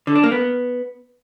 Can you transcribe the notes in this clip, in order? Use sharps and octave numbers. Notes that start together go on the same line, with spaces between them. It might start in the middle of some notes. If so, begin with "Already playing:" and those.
D3
D4
A#3
B3